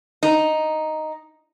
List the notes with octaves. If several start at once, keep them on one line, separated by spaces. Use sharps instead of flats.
D#4